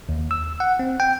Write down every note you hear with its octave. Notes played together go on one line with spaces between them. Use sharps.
D#2
E6
F#5
C4
G5